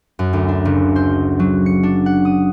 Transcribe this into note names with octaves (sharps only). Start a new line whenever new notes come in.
F#2
D2
D4
F#1
C5
F#3
C#7
D4
F#5
D#6